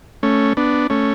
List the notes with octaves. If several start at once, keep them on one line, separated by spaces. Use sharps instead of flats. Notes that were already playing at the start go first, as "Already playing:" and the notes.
A3 C#4
B3 D4
A3 C#4